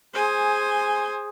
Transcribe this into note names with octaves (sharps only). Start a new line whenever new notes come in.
G#4 C5 G#5